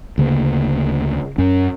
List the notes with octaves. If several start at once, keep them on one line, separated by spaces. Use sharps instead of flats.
D2 C#3 A#3
F#2 C#4